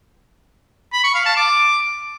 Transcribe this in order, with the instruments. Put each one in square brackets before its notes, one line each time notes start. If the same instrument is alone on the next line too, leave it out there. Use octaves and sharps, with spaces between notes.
[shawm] B5
C#6
F5
A5
D6